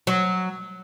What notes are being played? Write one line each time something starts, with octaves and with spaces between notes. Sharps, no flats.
F#3